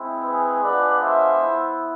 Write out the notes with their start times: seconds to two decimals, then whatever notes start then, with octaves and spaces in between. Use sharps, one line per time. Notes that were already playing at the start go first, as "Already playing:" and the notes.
Already playing: G#3 C4 E4
0.24 G#4 B4
0.62 G#3 B3 D4 F4 B4 D5
1.00 C5 E5
1.39 B3 E4